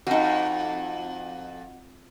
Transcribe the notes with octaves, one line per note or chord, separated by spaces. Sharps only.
F2 D#4 F#4